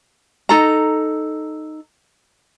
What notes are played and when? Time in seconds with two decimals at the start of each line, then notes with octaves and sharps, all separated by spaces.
0.49 D#4 A4 A#5